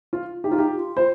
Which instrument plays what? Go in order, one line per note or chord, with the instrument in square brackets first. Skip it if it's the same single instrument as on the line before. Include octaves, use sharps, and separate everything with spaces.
[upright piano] F4
[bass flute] D#4 [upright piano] G4
[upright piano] F4
G4
[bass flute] F4
[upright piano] C5